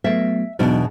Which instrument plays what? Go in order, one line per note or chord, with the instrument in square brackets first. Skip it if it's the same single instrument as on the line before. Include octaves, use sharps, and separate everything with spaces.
[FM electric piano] F#3 A3 B3 [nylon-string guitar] E5
[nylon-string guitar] E2 B2 D4 [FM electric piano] F#3 D#4